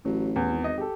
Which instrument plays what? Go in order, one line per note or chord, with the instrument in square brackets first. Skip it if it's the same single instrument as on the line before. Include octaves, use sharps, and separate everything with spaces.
[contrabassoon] A1 [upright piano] F#3
[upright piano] E2
[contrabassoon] G#1
[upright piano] D#5
G4 A4